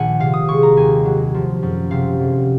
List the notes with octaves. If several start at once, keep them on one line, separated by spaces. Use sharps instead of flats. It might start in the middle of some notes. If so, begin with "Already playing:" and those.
Already playing: A#1 A#2 D#3 F#5 G#5
C3 F5
D#6
G#3 C#6
A#5
D#2 G#5
F#3
F3
F#2
C3 F5
F1